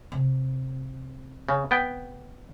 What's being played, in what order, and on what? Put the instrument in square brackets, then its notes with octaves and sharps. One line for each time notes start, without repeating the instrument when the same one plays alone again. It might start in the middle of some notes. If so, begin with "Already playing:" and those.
[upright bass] C3
[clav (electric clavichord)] C#3
B3 G5